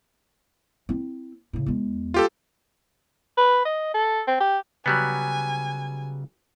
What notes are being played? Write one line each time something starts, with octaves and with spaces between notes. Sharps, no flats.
C4 E4
A2 C#3
E2 G#3
F4 G4 A4
B4
D#5
A4
C4
G4
C#3 F#3 G3 B3 G#5